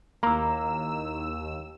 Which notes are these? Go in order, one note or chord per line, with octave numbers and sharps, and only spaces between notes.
D#2 A#3 E4 A#5 E6